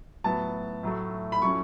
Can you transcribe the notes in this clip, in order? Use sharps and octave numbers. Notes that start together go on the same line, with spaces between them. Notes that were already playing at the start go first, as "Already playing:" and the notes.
A2 F#3 B3 A5
A2 F#3 A3
B5
A2 F#3 A3 C#4 C#6